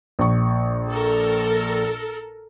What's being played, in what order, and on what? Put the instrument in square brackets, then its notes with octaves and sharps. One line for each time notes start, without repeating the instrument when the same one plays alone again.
[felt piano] A#1 C#6
[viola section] A4 A#4